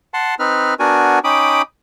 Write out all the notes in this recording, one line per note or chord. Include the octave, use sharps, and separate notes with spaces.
F#5 A5 C6
C4 D#4 B4 F6
B3 D4 F#4 A#4 G#5
C#4 D#4 G5 B5 D6 D#6